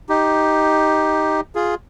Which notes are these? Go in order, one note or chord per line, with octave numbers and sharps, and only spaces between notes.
D#4 G4
F4 G#4